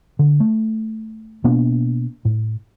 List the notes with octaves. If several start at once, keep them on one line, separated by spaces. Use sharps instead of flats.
D3
A3
B2 A#3 B3 D4
A2